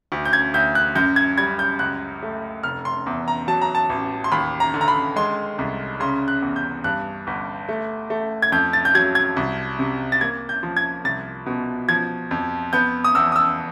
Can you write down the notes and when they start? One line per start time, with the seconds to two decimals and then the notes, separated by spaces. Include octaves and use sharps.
0.12 D2
0.25 G6
0.33 G#6
0.54 D2 G6
0.75 F#6
0.96 F#2 G6
1.16 G#6
1.37 G3 G#6
1.59 G6
1.79 C#2 F#6
2.23 A3
2.63 F1 F6
2.85 C6
3.06 E2
3.28 A#5
3.48 F#3 A5
3.61 A#5
3.75 A5
3.90 A1
4.24 C6
4.32 D#2 B5
4.60 A#5
4.74 D3
4.81 A#5
4.88 B5
5.16 G#3 C6
5.58 C2
6.00 C#3 C6
6.28 F#6
6.42 E2
6.56 G6
6.84 G2 F#6
7.27 G1
7.69 A3
8.10 A3
8.42 G#6
8.52 F2 G6
8.73 A6
8.85 G6
8.95 F#3 G#6
9.15 G#6
9.36 C2
9.79 C3
10.12 A6
10.21 A#3 G#6
10.49 G6
10.63 F3
10.77 G#6
11.04 C2 A6
11.46 B2
11.89 F3 G#6
12.31 F2
12.73 B3 G6
13.04 D#6
13.15 E2 E6
13.32 D#6
13.36 E6